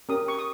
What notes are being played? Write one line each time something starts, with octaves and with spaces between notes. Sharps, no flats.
C#4 G4 A#4 D#6
C#6
D#6